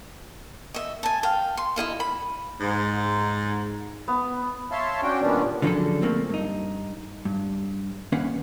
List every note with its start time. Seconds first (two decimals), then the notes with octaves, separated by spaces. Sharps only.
0.74 D#5 E5
1.03 G#5 A5
1.23 F5 G5
1.57 C6
1.76 E4 G#4 D#5 F5
2.00 B5
2.61 G#2
4.08 B3
4.71 C#5 E5 F5 A5 C6
5.03 C#4 D4 F#4 G5
5.22 A#2 D#3 G3 B3 C#4 D4
5.62 D3 F3 F#3 C#4 G#4 A4
6.02 F3 A3 A#3 C4
6.30 G2 D#4
7.25 G2
8.12 D#2 C#4 B4 F5 F#5